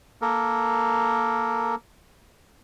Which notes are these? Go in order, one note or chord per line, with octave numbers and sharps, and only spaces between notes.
A#3 A4 A#4